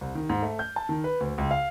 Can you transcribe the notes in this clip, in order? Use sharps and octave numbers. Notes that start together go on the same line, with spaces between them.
C2
D#3
G#2
A3
G6
A5
D#3
B4
D2
C#2
F5